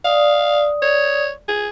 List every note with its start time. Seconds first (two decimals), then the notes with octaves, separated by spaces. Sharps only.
0.04 D5 F5 D#6
0.82 C#5
1.48 G#4